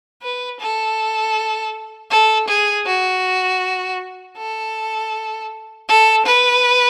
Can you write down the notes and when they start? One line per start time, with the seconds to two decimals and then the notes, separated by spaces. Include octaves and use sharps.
0.22 B4
0.60 A4
2.11 A4
2.48 G#4
2.86 F#4
4.37 A4
5.89 A4
6.26 B4